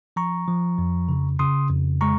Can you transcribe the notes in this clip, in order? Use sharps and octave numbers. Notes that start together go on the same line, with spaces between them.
F3 A#5 C#6
F3
F2
C#3
C#3 C6 D#6
F2
G#3 A#5 C#6